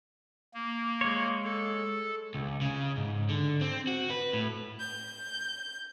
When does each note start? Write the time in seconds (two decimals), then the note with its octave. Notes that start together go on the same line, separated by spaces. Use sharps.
0.54 A#3
1.01 G#3 C#5
1.44 A4
2.35 C#2
2.61 C#3
2.97 G#2
3.29 D3
3.61 C4
3.87 F#4
4.10 B4
4.33 A2
4.79 G6